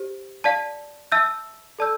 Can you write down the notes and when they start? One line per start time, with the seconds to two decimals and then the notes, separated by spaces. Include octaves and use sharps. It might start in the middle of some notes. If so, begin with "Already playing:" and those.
Already playing: G4 C5
0.44 D5 F5 A5
1.12 E5 A5 E6 G6
1.79 A4 D5 A5 E6 G6